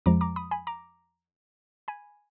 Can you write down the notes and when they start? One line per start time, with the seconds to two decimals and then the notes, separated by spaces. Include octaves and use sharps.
0.06 F2 F3 G#3 A#5 D6
0.21 A#5 D6
0.36 B5 D#6
0.51 G#5 B5
0.67 A#5 D6
1.88 G#5 B5